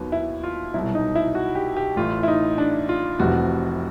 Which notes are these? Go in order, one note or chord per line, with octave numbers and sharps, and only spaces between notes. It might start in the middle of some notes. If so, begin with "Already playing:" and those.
Already playing: D#2 D#3 F#3 B3
E4
F4
C2 B2 F#3 E4
D#4
E4
F#4
G4
G4
A1 A2 E3 F4
E4
D#4
D4
F4
F1 F2 C3 E3 F#4